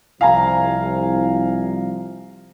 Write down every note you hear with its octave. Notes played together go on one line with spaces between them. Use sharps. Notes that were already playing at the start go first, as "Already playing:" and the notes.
C2 F3 F5 G#5 A#5